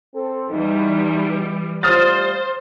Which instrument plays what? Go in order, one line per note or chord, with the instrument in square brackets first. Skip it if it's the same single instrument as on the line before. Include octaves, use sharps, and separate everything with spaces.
[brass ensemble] C4 A4
[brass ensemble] E2 D#4 [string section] E3 G3
[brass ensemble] A2 G3 F4 [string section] C5 [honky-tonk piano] D#6 F6 A6